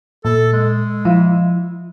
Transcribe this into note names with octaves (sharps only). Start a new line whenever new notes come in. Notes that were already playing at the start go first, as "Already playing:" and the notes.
A#2 A4
G#3
F3 E4 F4